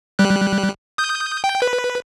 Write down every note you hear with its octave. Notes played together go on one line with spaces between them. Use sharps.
G3 F#6
D#6 G6
G5
B4